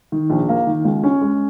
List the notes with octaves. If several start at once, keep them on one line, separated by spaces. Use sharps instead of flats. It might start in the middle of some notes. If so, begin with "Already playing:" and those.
D#3
A#1
A#3
D#3
C#2
C#4
G#3